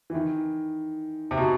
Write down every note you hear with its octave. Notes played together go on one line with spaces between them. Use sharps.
E3
D#3
C3
B2